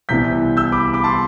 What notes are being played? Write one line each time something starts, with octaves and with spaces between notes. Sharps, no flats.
C2 C3 E3 G3 B3 G6 B6
E6 G6
B5 D6
B5 D6
A5 C6